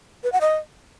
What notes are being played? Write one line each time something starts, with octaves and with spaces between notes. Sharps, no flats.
B4
F#5
D#5